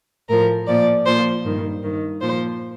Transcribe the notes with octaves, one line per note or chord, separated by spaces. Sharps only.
A2 F3 A#4
A#2 F3 D5
A#2 F3 C5
G2 D#3
G2 D#3
A#2 F3 C5